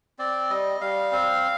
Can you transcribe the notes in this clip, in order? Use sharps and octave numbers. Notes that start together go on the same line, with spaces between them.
C4 D5
G3 D#5
G3 F5
C4